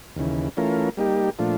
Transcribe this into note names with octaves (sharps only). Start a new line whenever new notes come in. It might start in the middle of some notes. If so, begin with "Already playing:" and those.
D#2 C#3 E3
E3 A3 C#4 F4 A#4
G3 A#3 D#4 G4
A#2 F3 A3 D4 F4